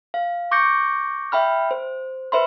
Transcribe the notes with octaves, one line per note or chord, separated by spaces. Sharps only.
F5
C#6 D6 G6 A#6 C#7
E5 G5 B5 F6
C5
B4 C5 E5 B5 C6